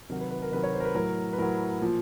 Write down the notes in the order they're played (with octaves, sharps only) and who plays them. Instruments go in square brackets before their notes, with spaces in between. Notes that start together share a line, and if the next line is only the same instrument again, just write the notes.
[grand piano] C3 D#3 F#3 A#4
B4
B4
A#4
C3 D#3 F#3 B4
C#5
C5
A#4
B4
A2 F#3 A#4
B4
A2 F#3 A#4
A#2 F3